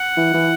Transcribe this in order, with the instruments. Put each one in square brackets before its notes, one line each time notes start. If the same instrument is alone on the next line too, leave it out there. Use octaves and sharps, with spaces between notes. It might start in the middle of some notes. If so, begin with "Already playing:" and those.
Already playing: [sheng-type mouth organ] F#5
[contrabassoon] E3
E3